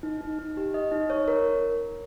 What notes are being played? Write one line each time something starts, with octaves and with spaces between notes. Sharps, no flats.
D#4
D#4
D#4
G4
D#5
D#4
C#5
A#4